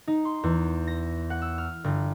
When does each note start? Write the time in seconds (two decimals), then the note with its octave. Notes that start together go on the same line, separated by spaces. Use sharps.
0.08 D#4
0.25 C6
0.43 E2
0.87 A#6
1.30 F#5
1.42 E6
1.58 F6
1.84 G1